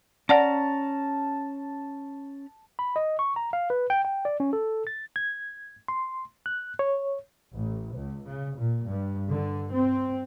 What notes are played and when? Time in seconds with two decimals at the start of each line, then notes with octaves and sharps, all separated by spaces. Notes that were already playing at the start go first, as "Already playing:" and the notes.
0.29 C#4 D5 F5 F#5 A5 A#5
2.79 B5
2.96 D#5
3.19 C#6
3.36 A#5
3.53 F5
3.70 B4
3.90 G5
4.05 G5
4.25 D5
4.40 C#4
4.53 A4
4.87 A6
5.16 G#6
5.88 C6
6.46 F#6
6.79 C#5
7.54 A1
7.95 C#2
8.28 C#3
8.58 A#2
8.88 G2
9.31 D3
9.72 C4